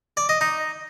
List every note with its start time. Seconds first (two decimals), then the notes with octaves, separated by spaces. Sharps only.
0.17 D5
0.29 D#5
0.41 D#4